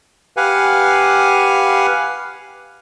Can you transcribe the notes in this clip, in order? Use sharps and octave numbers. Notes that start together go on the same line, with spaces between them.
G4 B4 F5 F#5 G#5